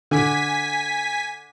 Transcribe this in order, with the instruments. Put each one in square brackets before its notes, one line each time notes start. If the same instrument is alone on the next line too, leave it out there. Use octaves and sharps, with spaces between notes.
[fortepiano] D3 [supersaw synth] G#5 B6